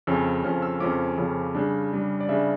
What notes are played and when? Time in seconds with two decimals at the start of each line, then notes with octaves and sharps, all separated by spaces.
0.07 F2 C#3 F3 C#4 E6
0.44 F2 C#3 F3 C#4 F6
0.62 E6
0.80 F2 C#3 F3 C#4 D6
1.17 F2 C#3 F3 C#4
1.55 C#3 G3 D4
1.92 C#3 G3 D4
2.20 D5
2.29 C#3 G3 D4 E5